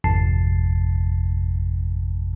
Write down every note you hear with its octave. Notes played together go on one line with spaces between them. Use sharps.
G#1 F2 C3 A5 C7